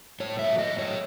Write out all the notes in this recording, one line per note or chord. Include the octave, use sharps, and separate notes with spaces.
A2 C#5
F#3 A3 E5
A2 D#5
F#3 A3 C#5